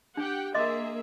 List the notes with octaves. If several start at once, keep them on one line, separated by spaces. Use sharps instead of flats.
D4 G4 F#5 G5
A#3 G#4 D#5 E5 C6 D6